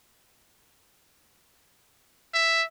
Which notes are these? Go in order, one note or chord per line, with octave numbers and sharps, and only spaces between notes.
E5